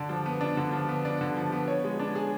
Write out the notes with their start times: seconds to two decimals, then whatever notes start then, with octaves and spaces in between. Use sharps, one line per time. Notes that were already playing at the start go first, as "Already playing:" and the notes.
Already playing: D3 D4
0.09 F3
0.26 B3
0.41 D4
0.57 D3
0.73 F3
0.89 B3
1.05 D4
1.21 D3
1.37 F3
1.52 B3
1.68 C#5
1.84 G#3
1.99 D4
2.15 G#4